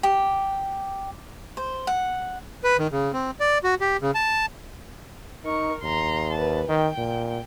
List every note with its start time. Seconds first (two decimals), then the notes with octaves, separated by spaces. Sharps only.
0.03 G4
1.57 C5
1.87 F#5
2.64 B4
2.79 D#3
2.92 C#3
3.13 C4
3.40 D5
3.64 F#4
3.81 G4
4.02 C#3
4.15 A5
5.44 D#4 A#4 C#6
5.83 D#2 A#5 C6
6.33 B4 A5
6.69 D#3 G5
6.98 A#2